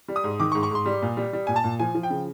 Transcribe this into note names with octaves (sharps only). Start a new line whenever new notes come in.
G3
D#6
G#2
D#3 D6
C#6
G#2
C#6
G#2 C6
G3
A#2
G3
G3
A#2 G#5
A5
A#2
F3 G#5
F3
G5
C#3